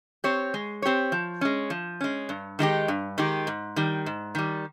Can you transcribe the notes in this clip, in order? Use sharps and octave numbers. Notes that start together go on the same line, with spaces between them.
C4 G4 C#5
G#3
C4 G4 C#5
F3
G#3 C#4
F3
G#3 C#4
G2
D#3 G#3 D#4 G4
G2
D#3 G#3 D#4 G4
G#2
D#3 G3
G#2
D#3 G3